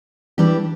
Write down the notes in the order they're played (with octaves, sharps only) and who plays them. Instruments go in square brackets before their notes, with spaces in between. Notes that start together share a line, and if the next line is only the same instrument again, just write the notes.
[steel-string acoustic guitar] E3 G3 D4 G4